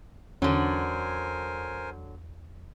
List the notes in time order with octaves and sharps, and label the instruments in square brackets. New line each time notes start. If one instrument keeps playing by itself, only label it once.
[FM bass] E2 [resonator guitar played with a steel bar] D3 F#3 [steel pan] C#4 [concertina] A#4 C5 G#5